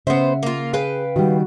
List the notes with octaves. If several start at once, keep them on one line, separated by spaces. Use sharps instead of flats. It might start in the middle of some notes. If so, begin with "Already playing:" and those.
C#3 B3 C#4 C5 E5 F#5
A#3 F4
G#4 B4 F5 G5
D#3 G3 F#4